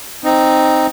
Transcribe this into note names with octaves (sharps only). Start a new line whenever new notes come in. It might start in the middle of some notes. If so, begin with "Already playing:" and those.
C4 D#4